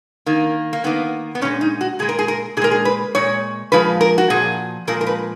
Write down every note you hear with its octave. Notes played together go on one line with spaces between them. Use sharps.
D#3 A#3
A#3
D#3 A#3 B3
B3
A#2 G#3 C#4
D#4
F#4
A#2 G#3 G#4
A#4
G#4
A#4
A#2 G#3 G#4 A#4
G#4
B4
A#2 G#3 C#5
A#2 F3 G#3 B4
A#4
F#4
A#2 F3 G#4
A#2 F3 G#3 A#4
A#4
B4